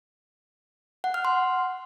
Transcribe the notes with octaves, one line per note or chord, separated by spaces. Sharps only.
F#5
F6
C6